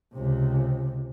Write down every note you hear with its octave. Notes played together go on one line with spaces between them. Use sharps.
C#2 C3